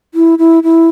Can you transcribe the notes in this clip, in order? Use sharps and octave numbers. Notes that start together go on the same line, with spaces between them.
E4
E4
E4